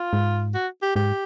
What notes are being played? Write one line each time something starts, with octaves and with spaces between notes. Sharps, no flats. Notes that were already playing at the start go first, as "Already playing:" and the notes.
Already playing: F4
G#2
F#4
G4
G#2 G4